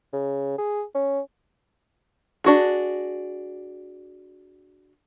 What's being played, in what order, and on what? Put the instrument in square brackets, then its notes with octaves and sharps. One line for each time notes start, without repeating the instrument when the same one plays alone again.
[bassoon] C#3
G#4
C#4
[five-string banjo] D4 F#4 G#4